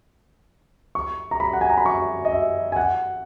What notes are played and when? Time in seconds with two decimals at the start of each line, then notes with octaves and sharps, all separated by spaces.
0.95 C#6
1.31 A#5
1.40 B5
1.53 F#5
1.61 G#5
1.69 A#5
1.77 B5
1.86 C#6
2.25 D#5
2.31 E5
2.72 G#5
2.76 F#5